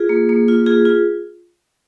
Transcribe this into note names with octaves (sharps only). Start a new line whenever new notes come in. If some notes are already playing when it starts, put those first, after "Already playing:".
Already playing: F4 G#4
A#3
A#3
F4
F4 G#4
F4